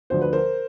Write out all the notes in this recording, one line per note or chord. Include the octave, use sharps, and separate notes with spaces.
D2 D3 F3 C5
B4
A#4 C5